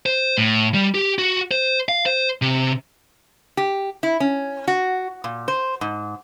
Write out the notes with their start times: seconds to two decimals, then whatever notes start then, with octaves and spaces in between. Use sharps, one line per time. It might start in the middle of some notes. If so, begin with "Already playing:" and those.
0.06 C5
0.38 A2
0.74 G3
0.95 G4
1.18 F#4
1.51 C5
1.89 F5
2.06 C5
2.42 C3
3.57 G4
4.03 E4
4.20 C#4
4.68 F#4
5.24 A#2
5.48 C5
5.81 G#2